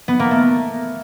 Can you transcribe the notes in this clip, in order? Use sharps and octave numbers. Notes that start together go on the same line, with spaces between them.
B3
A#3
A3